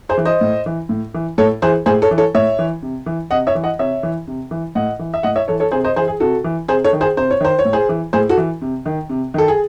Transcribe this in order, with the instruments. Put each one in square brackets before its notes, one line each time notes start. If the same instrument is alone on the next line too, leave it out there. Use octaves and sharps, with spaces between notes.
[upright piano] G#4 C5
E3
C5 D#5
A2
E3
A2
E3
A2 A4 C#5
E3 G#4 C5
A2 G#4 C5
A4 C#5
E3
A4 C#5
A2 C#5 E5
E3
C3
E3
C3 D#5 F#5
C#5 E5
E3
D#5 F#5
C3 C#5 E5
E3
C3
E3
A2 D#5 F#5
E3
E5
A2 D#5 F#5
C#5 E5
E3 A4 C#5
A4 C#5
C3 G#4 C5
C5 D#5
E3 G#4 C5
G#4
C3 F#4 A4
E3
C3 G#4 C5
A4 C#5
D#3
G#4 C5
C3 C5
C#5
D#3 C5
C#5
A2
G#4 C5
E3
A2 G#4 C5
F#4 A4
E3
C3
D#3
C3
D#3 A4
G#4